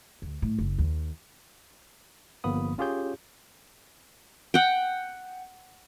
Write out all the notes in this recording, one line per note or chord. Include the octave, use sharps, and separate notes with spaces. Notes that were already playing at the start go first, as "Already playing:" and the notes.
D2
A2
F#1
D#2
G1 F3 A#3 B3 B5 D#6
C#4 F4 G4 G#4 C#5 G6
F#5 G5